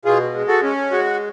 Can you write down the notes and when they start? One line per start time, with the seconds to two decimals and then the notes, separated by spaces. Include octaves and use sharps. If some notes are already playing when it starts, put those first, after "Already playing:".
0.05 B2 F4 G#4
0.34 G#3
0.48 F#4 A4
0.63 C#4
0.91 G#3 F#4